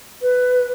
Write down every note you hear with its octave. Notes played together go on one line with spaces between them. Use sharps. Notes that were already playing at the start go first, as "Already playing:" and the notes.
B4